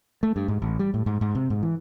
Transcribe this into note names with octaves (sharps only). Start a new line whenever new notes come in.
A3
G2
G#2
A1
G3
A2
G#2
G#2
C3
G#2
E3